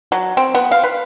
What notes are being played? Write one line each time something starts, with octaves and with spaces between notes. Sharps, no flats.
F#3
C4
B3
F5
B4